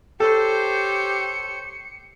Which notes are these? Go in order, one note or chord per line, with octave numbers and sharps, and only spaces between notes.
G4 A4 C5 C#5 C#7